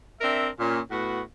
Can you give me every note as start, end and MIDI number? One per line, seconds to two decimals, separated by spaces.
0.21 0.47 60
0.21 0.47 62
0.21 0.47 70
0.21 0.47 76
0.59 0.78 46
0.59 0.78 61
0.90 1.20 45
0.90 1.20 59
0.90 1.20 66